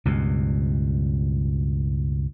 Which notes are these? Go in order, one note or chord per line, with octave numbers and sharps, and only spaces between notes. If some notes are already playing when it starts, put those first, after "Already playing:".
C#2 G2 B2